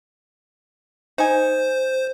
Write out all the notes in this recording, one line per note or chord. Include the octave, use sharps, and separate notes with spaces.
D#4 C5 G#5